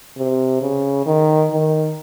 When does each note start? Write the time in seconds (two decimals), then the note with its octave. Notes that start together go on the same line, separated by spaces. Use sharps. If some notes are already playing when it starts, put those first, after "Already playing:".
0.17 C3
0.61 C#3
1.06 D#3
1.51 D#3